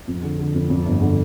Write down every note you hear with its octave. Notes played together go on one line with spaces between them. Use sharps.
F2
D3
D3
F2
F2
G1
D3